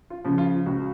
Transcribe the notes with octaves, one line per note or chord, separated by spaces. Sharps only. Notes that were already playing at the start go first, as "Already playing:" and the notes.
F4
C#3 F3
F4
C#2 F#4